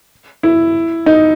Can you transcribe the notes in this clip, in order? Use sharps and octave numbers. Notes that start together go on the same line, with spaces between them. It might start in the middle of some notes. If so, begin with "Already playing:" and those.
E4
D#4